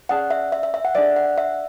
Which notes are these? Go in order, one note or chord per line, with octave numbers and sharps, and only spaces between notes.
C#4 G#4 D5 F#5 A5
E5
E5
E5
E5
F#5
D4 G#4 D5 E5
F#5
E5